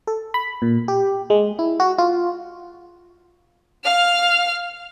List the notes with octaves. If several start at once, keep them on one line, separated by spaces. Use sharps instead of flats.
A4
B5
A#2
G4
G#3
E4
F#4
F4
F5 F6